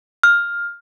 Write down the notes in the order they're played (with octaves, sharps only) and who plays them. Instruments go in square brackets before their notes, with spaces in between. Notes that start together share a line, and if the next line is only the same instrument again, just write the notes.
[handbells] F6